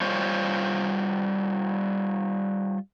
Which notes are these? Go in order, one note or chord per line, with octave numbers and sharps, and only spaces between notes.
G3 F4 C5 C#5